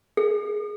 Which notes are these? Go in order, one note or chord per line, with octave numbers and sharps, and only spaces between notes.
G#4